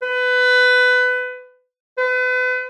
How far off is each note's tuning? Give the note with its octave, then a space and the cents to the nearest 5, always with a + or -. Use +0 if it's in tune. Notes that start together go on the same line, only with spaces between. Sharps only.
B4 +20
B4 +35